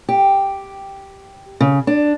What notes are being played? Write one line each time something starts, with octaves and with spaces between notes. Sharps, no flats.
G4
C#3
D4